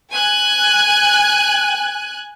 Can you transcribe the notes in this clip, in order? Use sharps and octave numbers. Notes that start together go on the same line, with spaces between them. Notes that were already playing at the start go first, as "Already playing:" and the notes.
G#5 F#6